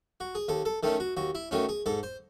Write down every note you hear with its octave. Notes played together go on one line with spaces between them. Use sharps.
F#4
G#4
D#2 A4
A4
D#3 A3 C#4 A4
F#4
D#2 F#4
E4
D#3 A3 C#4 F#4
G#4
G#2 A4
C5